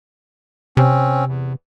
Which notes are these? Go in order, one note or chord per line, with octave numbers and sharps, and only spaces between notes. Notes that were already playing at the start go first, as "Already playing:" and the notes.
C3 C4 C#4
E2